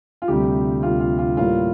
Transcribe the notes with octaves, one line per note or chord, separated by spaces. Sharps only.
F4
D2 C3 G3 G4
D2 C3 G3 F4
F4
F4
A2 G3 A#3 F4